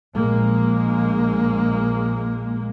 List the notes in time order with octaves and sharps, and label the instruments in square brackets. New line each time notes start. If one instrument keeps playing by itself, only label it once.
[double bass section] A#1 G#3 A#3